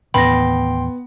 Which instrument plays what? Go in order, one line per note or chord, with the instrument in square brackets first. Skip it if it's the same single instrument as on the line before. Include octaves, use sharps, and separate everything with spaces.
[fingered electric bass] D#2 A2 E3 [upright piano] B3 [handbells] G5 C6 [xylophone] B5 A#6